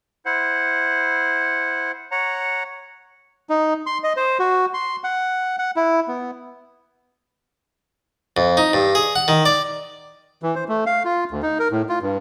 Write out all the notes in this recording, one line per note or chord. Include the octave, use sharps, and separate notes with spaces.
E4 C5 F#5
C#5 F#5 A#5
D#4
C6
D#5
C5
F#4
C6
F#5
F#5
E4
B3
F2
D#4
G2
G#4
F#5
D#3
D5
E3
C5
A3
F5
F4
D2
D#4
A#4
A2
F4
G2